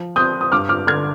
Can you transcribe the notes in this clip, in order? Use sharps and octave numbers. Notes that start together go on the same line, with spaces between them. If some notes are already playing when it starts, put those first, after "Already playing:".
Already playing: F3
C4 D#6 G6
D#6
G2 D6 F6
D6 F6
D3 F6 G#6